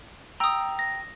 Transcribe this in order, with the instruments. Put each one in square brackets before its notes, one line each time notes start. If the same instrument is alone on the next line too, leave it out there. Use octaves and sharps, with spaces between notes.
[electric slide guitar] G5 A#5 [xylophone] D#6 E6
[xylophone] A#6